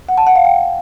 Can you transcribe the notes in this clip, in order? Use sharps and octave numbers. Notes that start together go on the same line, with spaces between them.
F#5
A5
F#5
F5
G5